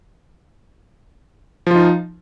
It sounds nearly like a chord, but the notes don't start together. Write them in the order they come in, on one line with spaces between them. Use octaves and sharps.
F3 F4 D#4